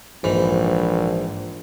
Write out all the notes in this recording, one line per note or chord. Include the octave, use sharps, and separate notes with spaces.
A#1 G#2 E3